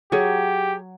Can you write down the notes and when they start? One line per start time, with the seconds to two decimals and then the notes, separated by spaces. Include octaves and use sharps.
0.12 F#3 G4 G#4 C#5